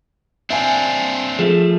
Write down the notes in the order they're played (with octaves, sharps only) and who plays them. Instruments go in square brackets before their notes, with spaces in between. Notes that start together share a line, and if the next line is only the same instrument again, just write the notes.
[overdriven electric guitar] C4 D4 [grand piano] E5 F5 G#5
[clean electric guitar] F3 A3 [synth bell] G#4 E5